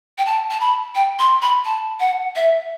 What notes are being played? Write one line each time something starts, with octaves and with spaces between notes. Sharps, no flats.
G5
A5
A5
B5
G5
C6
B5
A5
F#5
E5